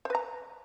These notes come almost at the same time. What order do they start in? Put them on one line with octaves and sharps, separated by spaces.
C5 B4 A#5